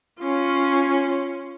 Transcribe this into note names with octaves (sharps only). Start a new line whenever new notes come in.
C#4 F4